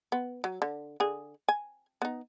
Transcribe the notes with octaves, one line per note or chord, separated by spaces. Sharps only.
B3
F#3
D3
D3 G#4
G#5
B3 D#4